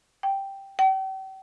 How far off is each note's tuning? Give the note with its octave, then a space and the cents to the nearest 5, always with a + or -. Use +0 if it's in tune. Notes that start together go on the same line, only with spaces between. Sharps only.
G5 +0
G5 -40